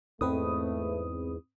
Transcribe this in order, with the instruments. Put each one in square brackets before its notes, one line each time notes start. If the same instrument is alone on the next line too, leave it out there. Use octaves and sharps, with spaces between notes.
[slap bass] E2 G#2 [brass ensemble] A3 [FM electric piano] C4 B4 D#6